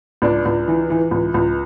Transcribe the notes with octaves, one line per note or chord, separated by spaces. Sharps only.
C#2 D4
C#2
E3
E3
C#2
C#2